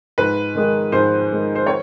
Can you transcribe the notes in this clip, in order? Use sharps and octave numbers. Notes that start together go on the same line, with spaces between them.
G#2 B4
D#3 G#3
G#2 C5
D#3 G#3
C5
C#5